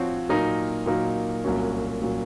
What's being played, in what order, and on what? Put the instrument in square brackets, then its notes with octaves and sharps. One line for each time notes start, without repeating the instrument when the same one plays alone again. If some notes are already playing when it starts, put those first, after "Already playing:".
Already playing: [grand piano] F3 C4 F#4 C#5
A#2 F#3 A#3 D#4 A#4
A#2 F#3 A#3 D#4 A#4
C2 A#2 F#3 C#4
A#2 F#3 C#4